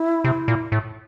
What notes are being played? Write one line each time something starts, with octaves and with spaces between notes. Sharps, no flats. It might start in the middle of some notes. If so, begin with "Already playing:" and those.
Already playing: E4
C3
A#2
A2